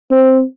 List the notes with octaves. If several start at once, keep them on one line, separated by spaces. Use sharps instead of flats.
C4